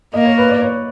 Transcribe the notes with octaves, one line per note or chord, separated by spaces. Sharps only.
A#3 D#5
C#5
B4
D5
C#5